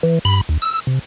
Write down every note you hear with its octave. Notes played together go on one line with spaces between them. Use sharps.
E3
G2 B5
D#2
E6
C3